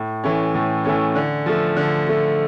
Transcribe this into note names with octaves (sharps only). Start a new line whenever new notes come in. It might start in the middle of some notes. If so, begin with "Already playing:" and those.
Already playing: A2
E3 A3 C#4
A2
E3 A3 C#4
D3
F3 A3
D3
F3 A3